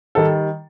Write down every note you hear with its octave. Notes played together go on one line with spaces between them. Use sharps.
D#3 G3 A4